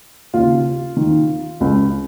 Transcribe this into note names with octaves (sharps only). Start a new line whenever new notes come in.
D#2 C#3 F4
D#2 D#3
C#2 C#3